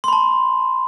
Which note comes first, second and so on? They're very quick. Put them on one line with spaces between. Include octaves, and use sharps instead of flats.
C6 B5 A5